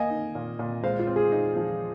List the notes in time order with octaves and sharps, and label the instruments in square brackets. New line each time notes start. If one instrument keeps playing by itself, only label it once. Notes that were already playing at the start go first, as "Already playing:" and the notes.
Already playing: [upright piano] A#3 [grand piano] D#5 G#5
[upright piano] D#4
A#2
A#2
[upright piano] G#3 [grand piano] C5 F5
[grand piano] F4
[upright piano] C4
[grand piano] G#4
[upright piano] D#4
F3